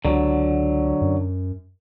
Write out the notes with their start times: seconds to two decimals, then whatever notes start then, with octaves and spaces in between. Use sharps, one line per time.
0.05 C#2 D3 F#3
1.01 F#2